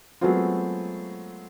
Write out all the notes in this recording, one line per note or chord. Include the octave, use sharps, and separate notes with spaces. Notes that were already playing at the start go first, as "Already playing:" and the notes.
F#3 G#3 A3 B3 C4 F4